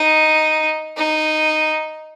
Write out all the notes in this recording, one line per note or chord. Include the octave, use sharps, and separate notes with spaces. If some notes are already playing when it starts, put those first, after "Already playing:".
Already playing: D#4
D#4